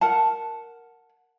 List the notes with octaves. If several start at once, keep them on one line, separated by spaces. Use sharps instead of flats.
A#4 F#5 A5